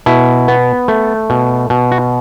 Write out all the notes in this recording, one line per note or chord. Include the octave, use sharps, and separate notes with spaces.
B2 E4
B3
A3
B2
B2
F#4